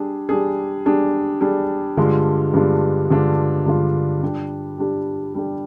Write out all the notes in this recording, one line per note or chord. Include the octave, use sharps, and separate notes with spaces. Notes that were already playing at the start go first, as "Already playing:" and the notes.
Already playing: G3 D4 G#4
G3 D4 G#4
G3 D4 G#4
G3 D4 G#4
G2 D3 G#3 D4 F4
G2 D3 G#3 D4 F4
G2 D3 G#3 D4 F4
G2 D3 G#3 D4 F4
G3 D4 G4
G3 D4 G4
G3 D4 G4